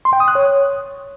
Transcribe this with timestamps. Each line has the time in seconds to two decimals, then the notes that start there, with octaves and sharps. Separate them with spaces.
0.05 C6
0.13 G5
0.20 D#6
0.28 F#6
0.35 C#5